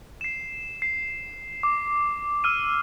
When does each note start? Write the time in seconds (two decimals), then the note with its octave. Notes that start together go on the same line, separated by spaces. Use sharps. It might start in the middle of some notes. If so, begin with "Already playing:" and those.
0.21 C7 E7
0.82 C7
1.63 D6
2.44 E6 F6 D#7